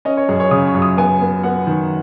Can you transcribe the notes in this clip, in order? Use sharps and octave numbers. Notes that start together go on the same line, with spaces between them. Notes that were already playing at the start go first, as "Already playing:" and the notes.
C#4 D#5
C#5
F#2 G#4
C#5
C#3 D#6
C#6
F#2
D#6
B3 G#5
B3
B3 F#5
D#3